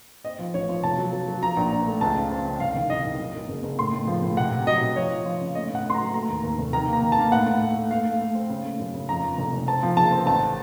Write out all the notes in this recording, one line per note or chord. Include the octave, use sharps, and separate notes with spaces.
C4 D#5
F3
A1 C#5
F3
F1 A5
F#3
F#3
F#3
F3 A#5
A#1
A#1
A3
C#2 A5
C#3
C4
C#3
C2 F5
D#3
C2 D#5
D#3
F#2
F#2
F#1
F#1
A2 C6
A2
F3
A2
C3 F#5
C3
F#3 D#5
C3
F3 C#5
F3
F3
C#3
A3 D#5
A2 F#5
A2
C6
A#5
F#3
A3 A#5
D#2
D#2
F1
D#3 A#5
A#3
A#5
D#3
A5
A#3
A2 F#5
A2
A3
A3
A3 F5
A3
A3
C4
C#3
A3
F#2
C#3
F2 A#5
F2
F1
F1
C4 A5
F3
F#1 A5
C4
A1 A5